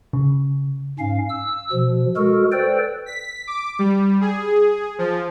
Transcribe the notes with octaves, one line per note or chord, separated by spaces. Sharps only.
C#3
G#2 C#4 F5
E6
B2 F3
G#3 F#4 A4 A#4
A4 B4 C5 D5 G5
B6
D6
G3
G#4
F3